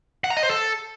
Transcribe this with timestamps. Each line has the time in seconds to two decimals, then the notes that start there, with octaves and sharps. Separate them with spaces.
0.24 F#5
0.30 A#5
0.37 D#5
0.43 C5
0.49 A4